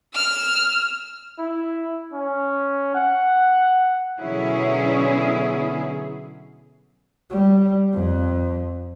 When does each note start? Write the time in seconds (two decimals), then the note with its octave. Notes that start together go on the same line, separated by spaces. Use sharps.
0.14 E6 F6
1.38 E4
2.13 C#4
2.95 F#5
4.19 B2 D3 F#3 C#4 E4 G#4
7.30 G3
7.93 F2